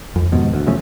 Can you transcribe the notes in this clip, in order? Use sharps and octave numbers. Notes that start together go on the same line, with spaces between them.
F2
D#2 G#2 B2
D2
C3 F3 A3 C#4